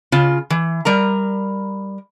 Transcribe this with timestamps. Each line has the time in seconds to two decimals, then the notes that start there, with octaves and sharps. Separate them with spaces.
0.12 C#3 F4
0.50 E3
0.85 G3 A#4 A#5